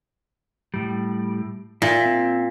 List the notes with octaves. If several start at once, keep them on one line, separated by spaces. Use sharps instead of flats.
A2 G3
A#2 E5
C4